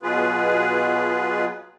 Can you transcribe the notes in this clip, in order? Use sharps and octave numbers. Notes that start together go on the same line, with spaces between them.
B2 F#3 F4 G#4 B4